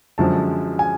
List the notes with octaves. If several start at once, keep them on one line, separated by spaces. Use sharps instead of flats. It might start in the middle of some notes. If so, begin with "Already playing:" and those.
F#2 D3 F3 G#3 A5
G#5